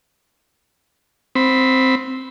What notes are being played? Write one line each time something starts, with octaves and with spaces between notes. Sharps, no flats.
C4 B5